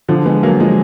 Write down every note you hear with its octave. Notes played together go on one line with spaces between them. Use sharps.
D3 F3
G#3 B3
F#3 A#3
F3 G#3